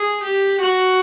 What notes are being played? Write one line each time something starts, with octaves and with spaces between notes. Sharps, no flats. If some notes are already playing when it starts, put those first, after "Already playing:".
Already playing: G#4
G4
F#4